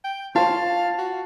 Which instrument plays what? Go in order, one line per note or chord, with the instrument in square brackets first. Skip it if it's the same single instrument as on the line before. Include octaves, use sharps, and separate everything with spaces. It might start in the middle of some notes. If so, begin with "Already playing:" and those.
[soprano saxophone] G5
[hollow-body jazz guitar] F4 C5 C#5 [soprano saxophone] F5 [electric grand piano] A5
[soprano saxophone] F#4